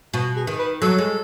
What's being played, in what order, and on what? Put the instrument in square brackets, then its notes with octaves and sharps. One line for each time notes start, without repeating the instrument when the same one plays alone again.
[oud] B2 [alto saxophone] F#4
[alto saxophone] G#4
[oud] D#3
[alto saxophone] B4
[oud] F#3 [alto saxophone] A4
[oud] G#3